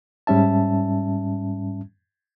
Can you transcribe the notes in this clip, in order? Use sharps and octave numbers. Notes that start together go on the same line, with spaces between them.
G#2 G3 C#4 E5 A5